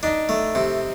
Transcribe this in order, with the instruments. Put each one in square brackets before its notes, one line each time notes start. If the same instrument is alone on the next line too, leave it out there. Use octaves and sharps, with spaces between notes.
[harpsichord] D4 [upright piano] D#4 D#5
[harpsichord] A3
C3